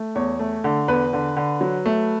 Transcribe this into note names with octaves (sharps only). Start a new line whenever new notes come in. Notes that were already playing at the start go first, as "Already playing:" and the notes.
Already playing: A3
E2 C#5
A3
D3
E2 B4
D3
D3
F#3
A3